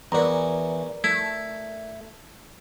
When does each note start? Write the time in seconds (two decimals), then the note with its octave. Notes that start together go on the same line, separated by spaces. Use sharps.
0.12 E2 E3 F#4 A#4 D5 A#5
1.04 A3 E4 A4